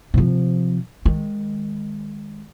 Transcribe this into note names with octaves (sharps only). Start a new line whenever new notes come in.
C3 F3
D#3 G#3